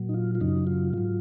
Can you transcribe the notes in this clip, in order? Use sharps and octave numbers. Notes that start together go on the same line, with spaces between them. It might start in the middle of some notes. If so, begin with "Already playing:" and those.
Already playing: A#2 F#3
D#4
F4
F4
F#2 C#3 F#3 D#4
F4
G#2 F#3 F4